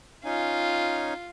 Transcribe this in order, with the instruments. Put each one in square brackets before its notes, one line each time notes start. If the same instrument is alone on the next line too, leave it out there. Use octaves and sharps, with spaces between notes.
[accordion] C#4 D#4 G#5 [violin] F4